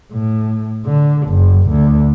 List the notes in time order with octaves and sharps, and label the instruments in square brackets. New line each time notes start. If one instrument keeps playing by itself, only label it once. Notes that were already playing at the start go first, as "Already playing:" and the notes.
[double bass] A2
D3
F#1
D2